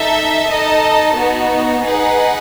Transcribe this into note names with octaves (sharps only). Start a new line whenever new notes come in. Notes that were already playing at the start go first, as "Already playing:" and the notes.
Already playing: D#4 A4 E5
D#4 A4 D#5 A5
B3 D#4 F#4
D#4 G#4 B4 F#5